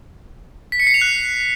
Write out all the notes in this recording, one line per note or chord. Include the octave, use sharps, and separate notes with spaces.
B6
C#7
C7
F7
F#6